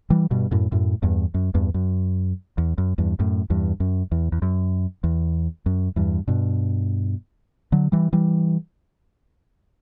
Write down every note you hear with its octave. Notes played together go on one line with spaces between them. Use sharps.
E3 G3
G2 B2
F#2 A2
F#2 A2
E2 G2
F#2
E2 G2
F#2
E2
F#2
E2 G2
F#2 A2
E2 G2
F#2
E2
E2
F#2
E2
F#2
E2 G2
G2 B2
D3 F#3
E3 G3
E3 G3